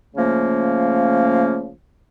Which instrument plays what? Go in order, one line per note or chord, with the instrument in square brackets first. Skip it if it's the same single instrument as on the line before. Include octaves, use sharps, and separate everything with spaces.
[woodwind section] C#3 F3 A3 A#3 C#4